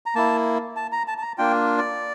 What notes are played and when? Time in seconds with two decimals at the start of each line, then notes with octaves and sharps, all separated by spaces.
0.06 A#5
0.15 A#3 E4 A5
0.76 A5
0.92 A#5
1.07 A5
1.18 A5
1.22 A#5
1.38 A#3 D4 F4 G5
1.78 D5